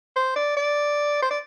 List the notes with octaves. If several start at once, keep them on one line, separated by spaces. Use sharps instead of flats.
C5
D5
D5
C5
D5